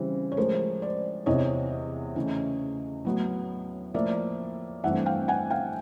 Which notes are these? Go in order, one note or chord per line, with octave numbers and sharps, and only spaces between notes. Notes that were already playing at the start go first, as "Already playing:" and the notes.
Already playing: C#3 E3 G3 C4
C#5
A2 F3 G#3 A#4 C5
C5 D5
E2 C3 E3 C#5 D#5
C#3 E3 A3
A2 F#3 B3
A2 F3 A#3 D5 E5
G2 E3 A3 C4 E5 F#5
F5 G5
F#5 G#5
F5 G5